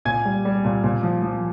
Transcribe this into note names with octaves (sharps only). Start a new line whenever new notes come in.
A#2 G#5 G#6
G3
G3
A#2
A#2
F3
F3